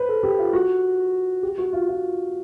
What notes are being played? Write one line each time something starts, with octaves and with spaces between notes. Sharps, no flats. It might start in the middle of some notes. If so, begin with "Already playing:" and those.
Already playing: B4 C5
A4
G4
F4
F#4
G4
F#4
F4
F4